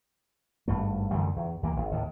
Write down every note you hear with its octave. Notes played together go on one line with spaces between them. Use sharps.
G#1 G2 A3
F#2 D3 E3 A3
E2
D#2 E3 A#3
G#1
D#2 A2